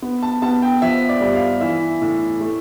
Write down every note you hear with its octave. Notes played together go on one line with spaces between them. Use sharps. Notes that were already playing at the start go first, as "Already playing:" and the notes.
B3
A5
B3 A5
G5
F3 E5
D5
G2
F5
E3 E5
A2
A3